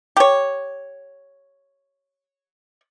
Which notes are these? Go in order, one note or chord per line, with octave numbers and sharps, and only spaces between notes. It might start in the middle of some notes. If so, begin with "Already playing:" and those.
G4 C#5